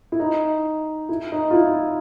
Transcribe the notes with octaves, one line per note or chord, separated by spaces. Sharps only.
E4
D#4
E4
D#4
F4
E4